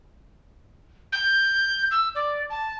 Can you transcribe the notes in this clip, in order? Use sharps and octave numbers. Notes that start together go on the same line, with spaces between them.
G6
E6
D5
A5